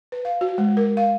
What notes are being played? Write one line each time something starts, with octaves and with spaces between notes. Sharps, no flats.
B4
F5
F#4
G#3
A#4
F5